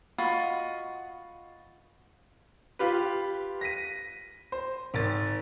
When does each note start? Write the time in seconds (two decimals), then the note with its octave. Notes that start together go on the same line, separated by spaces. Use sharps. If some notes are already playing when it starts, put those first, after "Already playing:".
0.18 F4 F#4 D#5 B5
2.79 F4 G4 B4
3.61 A#6 B6 D#7
4.52 C5
4.94 G#1 A6